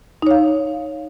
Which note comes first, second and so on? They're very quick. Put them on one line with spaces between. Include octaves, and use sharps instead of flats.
D#4 C#5 F5